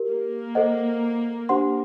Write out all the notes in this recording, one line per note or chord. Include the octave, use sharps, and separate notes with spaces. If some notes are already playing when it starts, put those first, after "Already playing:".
Already playing: G4 A#4
A#3
A4 C5 D#5 F#5
D4 G4 C5 F#5 C6